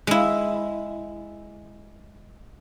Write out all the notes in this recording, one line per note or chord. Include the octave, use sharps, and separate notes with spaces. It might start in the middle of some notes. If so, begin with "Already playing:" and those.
G#3 E4